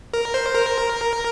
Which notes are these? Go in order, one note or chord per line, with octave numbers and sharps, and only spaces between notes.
A#4
C5
A#4